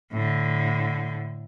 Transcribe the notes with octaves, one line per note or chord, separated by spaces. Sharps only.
A2 D3